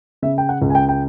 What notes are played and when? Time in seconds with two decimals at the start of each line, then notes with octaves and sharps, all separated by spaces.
0.22 C#3 E5
0.38 G5
0.49 F#5
0.62 C#2
0.70 G#5
0.75 G5
0.89 G5